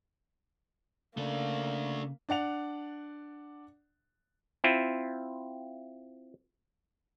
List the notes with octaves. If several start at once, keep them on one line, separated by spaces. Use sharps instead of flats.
C#3 A3 A#3 D4
D4 D5 F#5 F7
C4 E4 F4